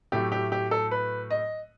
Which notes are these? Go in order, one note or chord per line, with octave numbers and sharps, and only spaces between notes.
A2 F#3 A3 G4
G4
G4
A4
B4
D#5